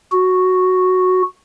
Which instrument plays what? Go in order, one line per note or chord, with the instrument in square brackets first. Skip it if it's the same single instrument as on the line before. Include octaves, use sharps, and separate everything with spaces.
[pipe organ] F#4